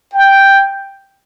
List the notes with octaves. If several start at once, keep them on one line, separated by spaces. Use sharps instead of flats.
G5